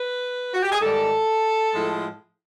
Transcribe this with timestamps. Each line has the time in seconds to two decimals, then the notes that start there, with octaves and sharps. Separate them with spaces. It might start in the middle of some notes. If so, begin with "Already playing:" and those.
Already playing: B4
0.54 F#4
0.63 G4
0.72 G#4
0.81 G#2 D#3 G3 A4
1.74 A2 F3 G#3